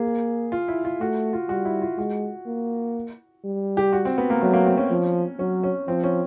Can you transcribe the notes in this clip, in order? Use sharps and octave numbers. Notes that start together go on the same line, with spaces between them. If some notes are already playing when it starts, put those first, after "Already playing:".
Already playing: A#3 G#4
F4
E4
F4
A3 F#4
F4
G3 F#4
E4
F4
G#3 F#4
A#3
G3
G4
F#4
C4
B3
A#3
F#3 A3
A#3
C4
C#4
F3
F#3 C#4
C#4
F3 C4
C#4